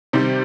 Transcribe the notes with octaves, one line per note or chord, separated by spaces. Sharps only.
C3 D#3 G3 C4 G4